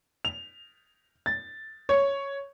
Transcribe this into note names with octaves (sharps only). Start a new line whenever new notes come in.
F7
A6
C#5